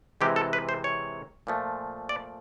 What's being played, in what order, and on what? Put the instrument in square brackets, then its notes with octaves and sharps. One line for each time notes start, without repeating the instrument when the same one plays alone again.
[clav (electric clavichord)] C3 E3 G#3 G4
A4
B4
C5
C#5
A#2 F3 A3
D5